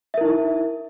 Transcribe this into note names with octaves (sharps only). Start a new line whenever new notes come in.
D#4 E4 A#4 E5